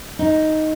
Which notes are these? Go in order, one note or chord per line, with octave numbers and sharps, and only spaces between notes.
D#4